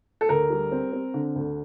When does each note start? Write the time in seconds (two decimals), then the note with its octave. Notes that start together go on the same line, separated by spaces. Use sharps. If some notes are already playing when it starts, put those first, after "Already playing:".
0.21 A4
0.29 D2 A#4
0.50 G3
0.72 C4
0.93 C4
1.14 D3
1.36 D2